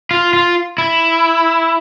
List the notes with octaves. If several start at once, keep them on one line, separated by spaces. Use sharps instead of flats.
F4
F4
E4